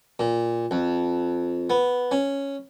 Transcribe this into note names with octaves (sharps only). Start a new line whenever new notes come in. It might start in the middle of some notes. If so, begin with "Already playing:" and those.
A#2
F2
B3
C#4